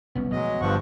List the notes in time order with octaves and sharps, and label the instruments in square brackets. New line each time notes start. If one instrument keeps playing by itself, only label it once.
[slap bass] F#1 C2 C#4 [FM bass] B3
[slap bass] B2 F3 A3 [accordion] F#3 G#3 D#5
[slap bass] G1 [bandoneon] G2 F3 [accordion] F#5 C#6